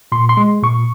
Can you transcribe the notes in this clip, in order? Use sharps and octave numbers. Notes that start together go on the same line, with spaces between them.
A#2 C6
C6
G#3
A#2 C#6